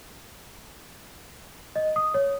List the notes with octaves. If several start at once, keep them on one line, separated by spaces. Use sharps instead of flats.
D#5
D#6
C#5